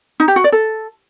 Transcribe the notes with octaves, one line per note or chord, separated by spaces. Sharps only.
D#4
G4
F#4
D5
A4